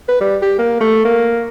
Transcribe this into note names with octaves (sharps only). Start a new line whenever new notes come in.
B4
G3
G4
A#3
A3
A#3